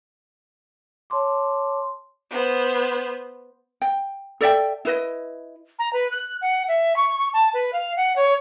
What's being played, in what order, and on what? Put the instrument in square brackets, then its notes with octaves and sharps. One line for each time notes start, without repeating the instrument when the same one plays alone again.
[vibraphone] C#5 A5 C6 D6
[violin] B3 C5
[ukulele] G5
A4 D5 E5 G5
E4 B4 D#5
[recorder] A#5
B4
F#6
F#5
E5
C#6
C#6
A5
B4
F5
F#5
C#5